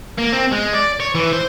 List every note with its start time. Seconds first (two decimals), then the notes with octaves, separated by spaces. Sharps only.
0.18 A#3
0.32 C4
0.52 G#3
0.73 D5
1.00 C#5
1.15 E3
1.33 C5